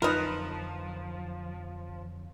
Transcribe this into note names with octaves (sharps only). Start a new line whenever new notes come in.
F2 D3 F3 F#3 D#4 F4 A#4 B4